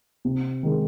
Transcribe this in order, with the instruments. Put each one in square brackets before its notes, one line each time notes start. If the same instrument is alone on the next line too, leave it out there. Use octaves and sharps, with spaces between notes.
[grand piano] C3
D#3 G#3